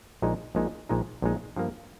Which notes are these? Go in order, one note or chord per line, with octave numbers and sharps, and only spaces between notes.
A#1 A#2 G#3 D#4
A#1 A#2 G#3 D#4
A#1 A#2 G#3 D#4
A#1 A#2 G#3 D#4
G2 F3 A#3